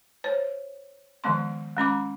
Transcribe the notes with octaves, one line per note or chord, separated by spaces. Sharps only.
C5 C#5
D#3 F3 G#3 B3 C6
G#3 C#4 B5 D6